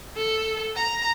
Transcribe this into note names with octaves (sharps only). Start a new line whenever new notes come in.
A4
A#5